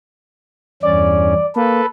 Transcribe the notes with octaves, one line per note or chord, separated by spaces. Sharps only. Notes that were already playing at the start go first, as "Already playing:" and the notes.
E2 G2 C#4 D5
A#3 A4 B4